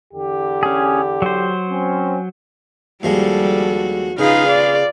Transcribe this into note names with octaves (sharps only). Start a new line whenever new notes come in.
E2 D3 G4
C#4 G#4
F#3 C5
C4 C#4
D#2 F3 G3 G#3 F#4 A4
C#3 D#4 F4 G#4 B4 F5
D5